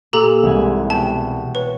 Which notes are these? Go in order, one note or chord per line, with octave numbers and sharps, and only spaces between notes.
A#2 G4 A4 A#5 E6
C2 G#2 E3 G#5
B2 G5 A5
B4 C#5